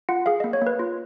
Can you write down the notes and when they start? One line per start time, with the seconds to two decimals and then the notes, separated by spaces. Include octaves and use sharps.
0.09 F4 F#5
0.26 G#4 F5
0.40 A#3 D#5
0.53 C#5
0.62 A#3 B4
0.79 F4